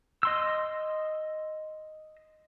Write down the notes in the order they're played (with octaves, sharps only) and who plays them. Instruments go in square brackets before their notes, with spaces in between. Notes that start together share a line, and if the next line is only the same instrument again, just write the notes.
[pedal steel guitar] D#5 C6 E6